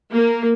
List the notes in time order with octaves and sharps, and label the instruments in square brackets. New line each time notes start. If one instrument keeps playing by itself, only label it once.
[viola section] A#3